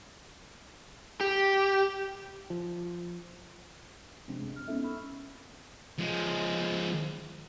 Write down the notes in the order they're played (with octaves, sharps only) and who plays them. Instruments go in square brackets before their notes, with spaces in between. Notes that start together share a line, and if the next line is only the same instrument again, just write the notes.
[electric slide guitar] G4
[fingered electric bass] F3
[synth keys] C3 F3 G#3 C4 D4
A#1 F#2 G#3
C4 F6
B3 C#4 D#4 E4 A4 E5
B5 C#6 E6 F6
[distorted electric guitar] F3 G#3